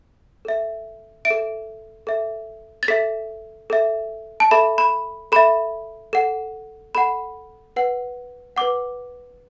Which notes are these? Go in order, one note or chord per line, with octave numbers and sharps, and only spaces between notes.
A4 E5
E5 D7
A4
A4 E5
A6
A4 E5 B6
A4 E5
A5
A4 E5 B5
B5
A4 E5 B5
A4 F#5
A4 F#5 B5
B4 F#5
B4 F#5 D6